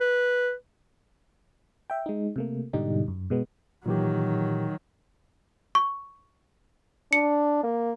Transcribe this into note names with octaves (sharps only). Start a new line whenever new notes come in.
B4
E5 G5
G#3 D#4
C3 A3 A#3
G#2 B2 D3 G3 D#4 G4
F#2
B2 G#3 B3
A#2 D#3 E3 F#3 G4
C#6
D4 C#7
A#3